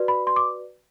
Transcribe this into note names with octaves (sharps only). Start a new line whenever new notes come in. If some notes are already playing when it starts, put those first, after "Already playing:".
Already playing: F#4 B4 D5
B5
C6
D6